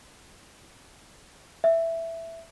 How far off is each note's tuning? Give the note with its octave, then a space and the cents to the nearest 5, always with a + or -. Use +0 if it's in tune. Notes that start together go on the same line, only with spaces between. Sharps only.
E5 +5